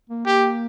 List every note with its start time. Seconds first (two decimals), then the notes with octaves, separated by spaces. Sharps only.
0.10 A#3
0.25 A#3 G4